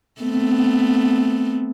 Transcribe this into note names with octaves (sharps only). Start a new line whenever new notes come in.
A3 B3 C4